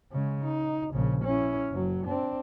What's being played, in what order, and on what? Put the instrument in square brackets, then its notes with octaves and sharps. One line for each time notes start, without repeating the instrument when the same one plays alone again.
[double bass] C#3 G#3
D#4
A#1 C#3
C#4 E4
F#1 F#3
C4 D4